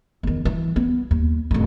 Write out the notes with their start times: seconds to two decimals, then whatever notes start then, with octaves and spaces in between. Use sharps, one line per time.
0.23 E2 D#3
0.45 E3
0.76 B3
1.11 D#2
1.51 D1 F2